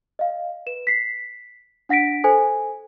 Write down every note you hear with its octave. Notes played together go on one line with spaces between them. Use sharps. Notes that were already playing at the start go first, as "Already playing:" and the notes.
D#5 F5
B4 E7
B6 C7
D4 F#5 A#6 B6 D7
A4 C5 G#5